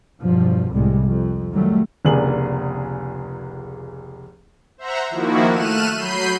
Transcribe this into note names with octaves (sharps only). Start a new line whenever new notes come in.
E2 G2 B2 F3
C2 A2 C3 G3 G#3
F2
D#3 F#3 G3 A3
F1 C#2 A#3 D4 G#4 F#7
C5 E5 F#5 A#5
D#3 F3 A#3 E4 F#4
A3 F6 F#6 D#7 E7
F#3 B5 G6 C7 D#7